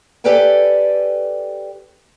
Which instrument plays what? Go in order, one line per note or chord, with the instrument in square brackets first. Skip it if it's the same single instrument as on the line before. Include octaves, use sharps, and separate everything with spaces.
[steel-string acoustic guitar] G4 A4 B4 D5 G5 G#5